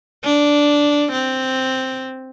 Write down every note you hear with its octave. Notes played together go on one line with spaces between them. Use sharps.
D4
C4